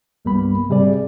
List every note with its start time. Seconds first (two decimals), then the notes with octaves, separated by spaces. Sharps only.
0.25 C2 G2 G3 A#3 B3 B5
0.69 G#2 C3 G3 G#4 D5